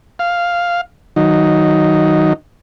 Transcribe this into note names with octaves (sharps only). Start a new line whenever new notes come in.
F5
D#3 F#3 D#4